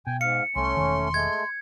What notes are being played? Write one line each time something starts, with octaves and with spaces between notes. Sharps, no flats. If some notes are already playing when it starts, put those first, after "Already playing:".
B2 G5 G#5
G#2 F5 C#7
C2 A3 C#4 C6
E1 D#3
G#3 A3 G#6